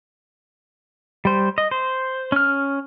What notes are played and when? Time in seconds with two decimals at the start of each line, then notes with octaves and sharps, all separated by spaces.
1.25 G3 C5
1.58 D#5
1.71 C5
2.32 C#4 F6